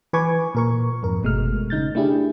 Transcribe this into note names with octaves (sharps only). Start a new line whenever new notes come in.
E3 B4 G#5 C#6 D6 G#6
A#2 A#4 C#6
F2 G#2 A#4
G1 B2 G#3 A3 F6
C#3 D#4 G6 A6
A3 D4 E4 G4 G#4